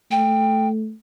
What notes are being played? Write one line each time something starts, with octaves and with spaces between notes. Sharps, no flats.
A3 G5